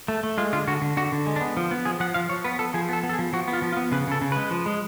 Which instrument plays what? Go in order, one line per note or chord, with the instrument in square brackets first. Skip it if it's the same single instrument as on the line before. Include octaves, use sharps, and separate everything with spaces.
[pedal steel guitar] A3
A3
G#3 F4
D3 F4
D3 F#4
D3
D3 F#4
D3
G#3
D4
B3
F3
B3
F3 G#4
F3 F#5
F3 F5
F3 C#5
B3 B4
B3 A4
F3 G#4
B3 A4
B3
A4
G#4
F3
F3 F#4
B3
F4
F3
F4
B3
C#3 B4
C#3 A4
C#3
G#3 B4
F3
G#3